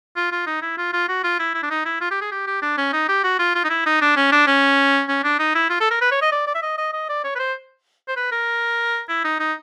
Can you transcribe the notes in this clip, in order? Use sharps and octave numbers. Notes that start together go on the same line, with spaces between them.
F4
F4
D#4
E4
F4
F4
F#4
F4
E4
E4
D4
D#4
E4
F4
G4
G#4
G4
G4
D4
C#4
D#4
G4
F#4
F4
F4
D#4
E4
D#4
D4
C#4
D4
C#4
C#4
D4
D#4
E4
F4
A4
A#4
B4
C#5
D#5
D5
D5
E5
D#5
D#5
D#5
D5
C#5
B4
C5
C5
B4
A#4
E4
D#4
D#4